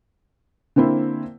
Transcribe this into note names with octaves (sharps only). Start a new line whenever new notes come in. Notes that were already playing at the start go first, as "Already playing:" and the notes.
D3 A#3 C4 E4 C5